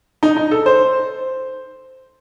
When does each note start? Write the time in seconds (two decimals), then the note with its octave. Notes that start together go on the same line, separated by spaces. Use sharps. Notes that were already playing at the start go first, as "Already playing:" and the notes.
0.23 D#4
0.37 D#4
0.51 A4
0.66 C5